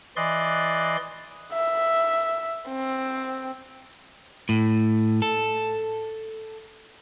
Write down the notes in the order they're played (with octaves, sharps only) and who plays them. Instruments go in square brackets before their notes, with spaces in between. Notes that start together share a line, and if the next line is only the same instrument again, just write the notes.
[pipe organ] E3 D5 D#5 C6 F#6 A6
[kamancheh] E5
C4
[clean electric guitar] A2
A4